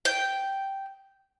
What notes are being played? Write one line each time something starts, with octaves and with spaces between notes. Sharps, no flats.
G5